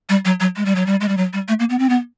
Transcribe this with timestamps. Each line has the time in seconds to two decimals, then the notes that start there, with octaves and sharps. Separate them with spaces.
0.09 G3
0.25 F#3
0.40 F#3
0.56 G#3
0.66 G3
0.75 F#3
0.86 G3
1.01 G#3
1.08 G3
1.17 F#3
1.33 G3
1.48 A3
1.59 A#3
1.70 B3
1.79 C4
1.89 B3